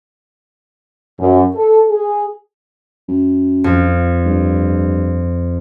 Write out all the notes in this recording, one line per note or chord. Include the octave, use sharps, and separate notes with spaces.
F#2
A4
G#4
F#2
F2
G2